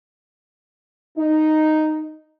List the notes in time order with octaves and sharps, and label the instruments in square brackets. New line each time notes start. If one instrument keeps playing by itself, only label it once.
[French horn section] D#4